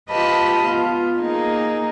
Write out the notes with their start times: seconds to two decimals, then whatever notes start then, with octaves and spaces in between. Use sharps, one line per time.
0.11 F4 G4 B4 D#5 A5 B5
0.64 B3 F4
1.19 A#3 D#4 G#4